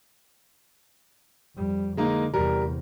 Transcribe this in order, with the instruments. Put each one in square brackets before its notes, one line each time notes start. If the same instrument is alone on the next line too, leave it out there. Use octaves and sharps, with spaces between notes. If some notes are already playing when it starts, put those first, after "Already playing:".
[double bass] F2 G3
[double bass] D3 [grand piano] G#3 A#3 D#4
[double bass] E2 C3 [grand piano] G3 A#4